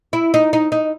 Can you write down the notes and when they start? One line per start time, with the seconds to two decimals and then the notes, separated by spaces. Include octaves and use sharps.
0.13 E4
0.34 D#4
0.53 D#4
0.72 D#4